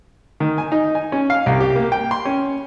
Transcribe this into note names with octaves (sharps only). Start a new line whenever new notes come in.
D#3
G#5
D#4
G#5
C#4
F5
C2
G4
A#3
G5
C6
C#4